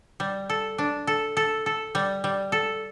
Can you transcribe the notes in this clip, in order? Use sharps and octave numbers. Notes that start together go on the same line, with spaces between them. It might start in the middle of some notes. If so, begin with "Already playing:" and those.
G3
A4
D4
A4
A4
A4
G3
G3
A4